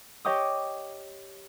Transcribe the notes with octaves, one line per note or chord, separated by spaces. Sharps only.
G4 C#5 D#5 G5 D6 D#6